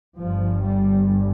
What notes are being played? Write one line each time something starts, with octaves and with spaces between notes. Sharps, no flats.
G1 G2 F3
G3